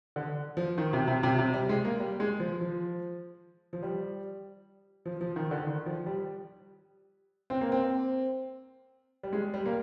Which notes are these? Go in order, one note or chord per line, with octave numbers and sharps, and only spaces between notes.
D3
F3
D#3
C3
C3
C3
C3
G3
G#3
A#3
G3
G#3
F3
F3
F3
G3
F3
F3
D#3
D3
D#3
F3
G3
C4
A#3
C4
G3
G#3
G3
A#3